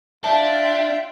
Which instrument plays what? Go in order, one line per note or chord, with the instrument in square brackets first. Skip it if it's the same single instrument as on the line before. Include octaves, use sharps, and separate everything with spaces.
[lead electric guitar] D4 [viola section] F4 G5 [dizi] E5 [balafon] A5